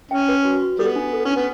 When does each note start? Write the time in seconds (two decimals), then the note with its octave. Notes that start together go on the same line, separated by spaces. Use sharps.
0.11 C#4 G5
0.28 B4
0.45 F#4
0.62 F#4
0.79 G3 B3 A4
0.96 D4
1.13 A4
1.25 C#4 D4
1.36 B3